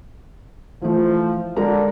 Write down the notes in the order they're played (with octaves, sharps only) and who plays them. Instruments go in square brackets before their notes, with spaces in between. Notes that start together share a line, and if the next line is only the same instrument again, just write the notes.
[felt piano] E3 A3 [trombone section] F3
[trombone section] D3 [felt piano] G#3 A#4 A#5